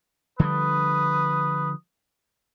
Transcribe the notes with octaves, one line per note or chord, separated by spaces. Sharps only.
D3 F3 G3 B4 D#6